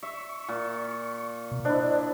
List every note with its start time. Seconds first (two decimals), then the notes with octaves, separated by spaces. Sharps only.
0.03 E5 C#6
0.49 A#2
1.51 B2
1.65 D4 E4 C5 D5 D#5